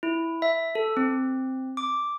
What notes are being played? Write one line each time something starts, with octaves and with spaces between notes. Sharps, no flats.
E4
E5
A4
C4
D6